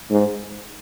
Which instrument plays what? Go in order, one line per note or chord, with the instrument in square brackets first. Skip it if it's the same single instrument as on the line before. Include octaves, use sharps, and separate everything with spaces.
[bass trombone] G#2